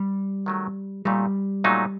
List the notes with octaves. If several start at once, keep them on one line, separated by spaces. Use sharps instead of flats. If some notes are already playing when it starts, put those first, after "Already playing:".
Already playing: G3
D#3 F#3 A3
A#2 F#3 G3 A3 D#4
A#2 F#3 A3 D#4